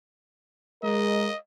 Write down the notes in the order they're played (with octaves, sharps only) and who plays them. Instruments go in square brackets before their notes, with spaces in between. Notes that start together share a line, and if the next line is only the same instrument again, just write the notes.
[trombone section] G#3 A#4 [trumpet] D#5